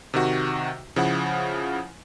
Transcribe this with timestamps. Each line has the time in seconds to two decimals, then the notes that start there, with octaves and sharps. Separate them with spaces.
0.14 C3 D#3 F#4
0.96 C#3 F3 E4 F#5